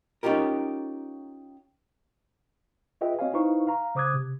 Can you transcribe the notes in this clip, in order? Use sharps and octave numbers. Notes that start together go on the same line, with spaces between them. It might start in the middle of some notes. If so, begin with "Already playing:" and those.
C#4 D#4 F4 G4 A#4
F4 G#4 B4 D#5 E5 G5
C4 F#4 C#5 D#5 F5 G#5
D#4 E4 B4 C5 F5 C#6
F5 A#5
C#3 C5 D6 D#6 F#6 G#6
C3